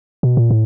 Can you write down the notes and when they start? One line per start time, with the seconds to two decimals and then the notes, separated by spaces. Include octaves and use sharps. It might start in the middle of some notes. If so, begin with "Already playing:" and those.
0.23 B2
0.37 A#2
0.51 A2